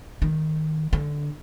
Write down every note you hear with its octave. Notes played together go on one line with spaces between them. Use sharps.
D#3
D3